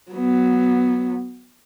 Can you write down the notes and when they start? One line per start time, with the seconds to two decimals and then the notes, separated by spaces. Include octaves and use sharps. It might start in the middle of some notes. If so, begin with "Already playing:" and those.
0.12 F#3 B3